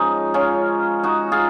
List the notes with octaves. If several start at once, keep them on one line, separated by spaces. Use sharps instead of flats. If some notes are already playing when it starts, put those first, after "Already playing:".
Already playing: F3 G#3 C#4 D#4
C#4 F4
D#4 F#4
F4 G#4